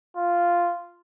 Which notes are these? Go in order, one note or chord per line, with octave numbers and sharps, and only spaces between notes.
F4